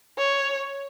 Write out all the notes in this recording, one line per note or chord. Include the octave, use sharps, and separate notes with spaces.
C#5